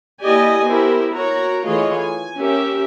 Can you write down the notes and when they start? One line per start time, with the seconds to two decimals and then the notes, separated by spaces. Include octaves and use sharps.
0.21 A#3 E4 G4 D5 D#5 G#5
0.64 B3 E4 G4 A#4 C5
1.12 F#4 A#4 C#5 A#5
1.66 E3 A3 F4 G#4 C#5 D#5
1.98 G#5
2.37 C#4 G4 A#4 E5